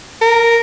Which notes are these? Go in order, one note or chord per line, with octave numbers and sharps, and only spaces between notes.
A#4